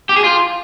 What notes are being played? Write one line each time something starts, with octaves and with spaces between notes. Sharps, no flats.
G4
G#4
F4